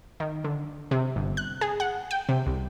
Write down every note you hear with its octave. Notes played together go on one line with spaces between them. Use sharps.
D#3
D3
C3
G1
F#6
G#4
F#5
G5
C3
C2